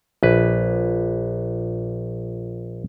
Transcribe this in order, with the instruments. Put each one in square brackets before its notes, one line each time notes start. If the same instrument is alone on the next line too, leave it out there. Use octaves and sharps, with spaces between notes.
[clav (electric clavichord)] A#1 B4